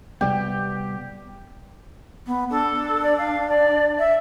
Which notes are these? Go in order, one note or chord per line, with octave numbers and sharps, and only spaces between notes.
C3 G3 B3 G4
B3
D4 A4
D5
F5
D5
E5